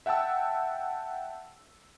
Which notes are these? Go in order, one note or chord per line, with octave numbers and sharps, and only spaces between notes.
E5 F#5 G5 A5 E6